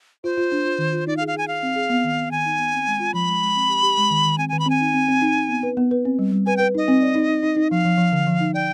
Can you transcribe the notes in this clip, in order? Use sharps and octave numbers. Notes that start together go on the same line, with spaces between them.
F4 C5
F4
D4
F4
D#3
F4
D#4 D5
F5
G#4
F5
G#4 G#5
G#4 F5
C4
G#4
B3
D#3
B3
D#3 G#5
D#4
B3
C4
G#3
F4
F3 B5
G#3
G#3
C4
G4
G4
G#3
D#3
D#3
C4 G#5
D#3 G#5
B5
C4 G#5
D#4
C4
C4
D#4
D#4
B3
B4
B3
B4
C4
G3
G3
B4 G#5
B4 G5
D#4 D#5
C4
D5
D#4
D#4
D#4
D#4
F3 F5
F3
F3
D3
F3
D#4
D5 G5